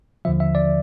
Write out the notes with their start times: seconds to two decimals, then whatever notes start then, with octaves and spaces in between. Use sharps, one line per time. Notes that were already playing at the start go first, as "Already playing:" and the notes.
0.25 D#2 D3 F3 E5
0.40 E5
0.55 D5